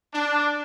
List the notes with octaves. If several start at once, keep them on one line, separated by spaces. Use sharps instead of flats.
D4